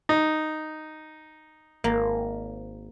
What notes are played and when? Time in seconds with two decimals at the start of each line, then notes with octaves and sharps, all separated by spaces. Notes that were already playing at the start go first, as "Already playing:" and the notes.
0.09 D#4
1.84 G#1 A#3